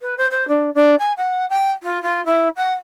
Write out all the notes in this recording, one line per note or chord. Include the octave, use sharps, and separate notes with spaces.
B4
C5
C5
D4
D4
G#5
F#5
G5
F4
F4
E4
F#5